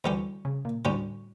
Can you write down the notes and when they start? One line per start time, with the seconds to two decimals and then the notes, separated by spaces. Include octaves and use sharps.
0.04 D2 D3 E3 G3 C#4 G4
0.45 C#3
0.65 A#2
0.85 D2 A2 D3 G3 C#4 G4